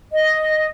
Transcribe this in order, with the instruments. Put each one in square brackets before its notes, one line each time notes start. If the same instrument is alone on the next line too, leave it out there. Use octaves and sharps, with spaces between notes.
[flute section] D#5